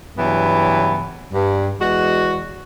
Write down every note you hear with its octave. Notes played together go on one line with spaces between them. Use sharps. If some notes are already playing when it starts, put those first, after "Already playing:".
G2 C#3 E3 F#3 B3
G2
E2 G#3 F#4